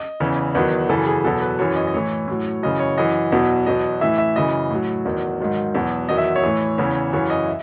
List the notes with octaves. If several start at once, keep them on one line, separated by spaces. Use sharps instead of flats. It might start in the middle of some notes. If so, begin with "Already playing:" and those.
Already playing: D#5
E2 C#3 E3
E2 D#3 F#3 B4
F#2 C#3 E3 A4
G#4
E2 B2 F#3 A4
B4
F#2 E3 C#5
D#5
D#5
A2 E3 C#5
A2 F#3
F#2 C#3 E3 D#5
C#5
F#2 E3 D#5
E2 B2 F#3
E2 B2 F#3 D#5
A2 E3 E5
E5
F#2 C#3 E3 D#5
A2 F#3
E2 D#3 F#3
G#2 D#3 F#3
E2 B2 F#3
E2 D#3 F#3 D#5
E5
C#5
A2 E3
E2 C#3 E3
F#2 C#3 E3 C#5
D#5
E5